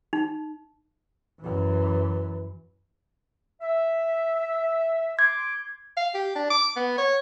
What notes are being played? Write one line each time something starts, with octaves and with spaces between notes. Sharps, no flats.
D#4
F#2 E3
E5
C6 D6 G#6
F5
G4
D4
D6
B3
C#5